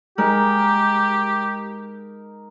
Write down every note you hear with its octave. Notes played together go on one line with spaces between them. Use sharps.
G#3 D#4 G4 A#4